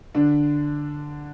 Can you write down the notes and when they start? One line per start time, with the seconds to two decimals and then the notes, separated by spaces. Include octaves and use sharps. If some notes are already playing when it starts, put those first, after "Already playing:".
0.15 D3 D4